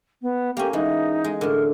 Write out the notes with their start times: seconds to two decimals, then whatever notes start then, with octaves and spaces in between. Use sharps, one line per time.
0.22 B3
0.57 A#3 C#4 G4
0.73 E3 G#3 D#4
1.24 G#3
1.41 A2 D3 A#4